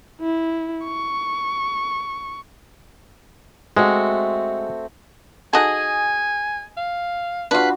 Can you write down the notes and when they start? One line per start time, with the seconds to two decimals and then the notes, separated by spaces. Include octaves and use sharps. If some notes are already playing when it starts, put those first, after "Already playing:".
0.21 E4
0.84 C#6
3.77 G#3 A3 C4 F#4
5.53 D#4 F#4 G#4 A4 D#5 G#5
6.77 F5
7.51 D4 F4 F#4 B4 F5